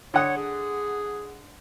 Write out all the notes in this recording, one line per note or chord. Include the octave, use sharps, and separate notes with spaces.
D3 C#5 F#5 D#6
G#4